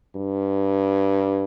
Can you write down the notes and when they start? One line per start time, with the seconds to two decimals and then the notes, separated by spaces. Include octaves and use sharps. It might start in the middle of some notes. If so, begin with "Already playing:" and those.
0.16 G2